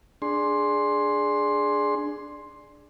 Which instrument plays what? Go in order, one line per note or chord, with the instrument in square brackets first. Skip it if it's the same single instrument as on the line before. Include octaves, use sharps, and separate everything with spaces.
[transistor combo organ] D4 G#4 C6